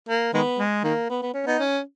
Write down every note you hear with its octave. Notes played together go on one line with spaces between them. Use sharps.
A#3
D#3 G#3 B3
G#3
D#3 A#3
B3
B3
C#4
B3 D#4
C#4